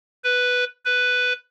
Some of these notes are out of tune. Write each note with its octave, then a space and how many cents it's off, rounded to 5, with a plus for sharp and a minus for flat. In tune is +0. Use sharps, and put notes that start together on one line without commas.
B4 +0
B4 +5